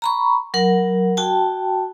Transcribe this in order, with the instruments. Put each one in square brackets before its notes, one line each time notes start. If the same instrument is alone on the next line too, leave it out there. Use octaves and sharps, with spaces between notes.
[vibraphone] A#5 B5 C#6
F#3 A#4 F#5
F#4 G5 A5